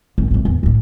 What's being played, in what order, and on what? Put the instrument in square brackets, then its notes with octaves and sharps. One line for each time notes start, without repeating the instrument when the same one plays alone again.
[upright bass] G#1
G#1 F2
E2
F2 A2